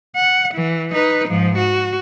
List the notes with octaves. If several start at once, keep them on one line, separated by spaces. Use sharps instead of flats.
F#5
E3
D#4 B4
G#2 F3
F#4